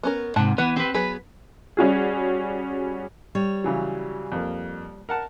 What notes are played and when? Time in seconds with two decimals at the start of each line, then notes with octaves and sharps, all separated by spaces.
0.03 B3 C#4 A#4
0.36 G#2 C3 F#5 A5
0.58 E3 B3 B4 F#5
0.76 C4 G4 B4
0.94 F#3 B3 G#4 B4
1.77 G3 C#4 F#4 G#4
3.35 G3 C#5
3.64 C#3 E3 F#3
4.32 F2 A#3
5.09 A#4 F#5 A5